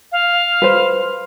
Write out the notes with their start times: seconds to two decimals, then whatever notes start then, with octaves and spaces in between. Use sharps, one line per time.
0.12 F5
0.62 B4 C5